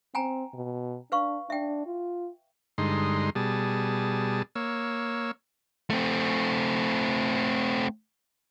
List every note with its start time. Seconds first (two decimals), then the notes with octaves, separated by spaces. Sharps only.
0.15 C4 G5 G#5 A#5
0.54 B2
1.12 D4 B4 F5 C#6
1.50 D4 E5 G5
1.86 F4
2.78 G2 D3 G#3 D#4 C6
3.35 B2 G3 G#4 A5
4.55 A#3 C#5 E6
5.90 A3 C4